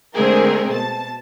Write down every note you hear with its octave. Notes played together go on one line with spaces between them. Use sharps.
D3 G#3 A3 C4 G#4 A#4
B2 A5